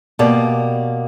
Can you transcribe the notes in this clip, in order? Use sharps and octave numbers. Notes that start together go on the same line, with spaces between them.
B2 A#3 G4 D5